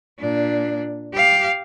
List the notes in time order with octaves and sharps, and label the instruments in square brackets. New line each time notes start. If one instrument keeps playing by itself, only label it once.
[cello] A#2 D4
G4 F5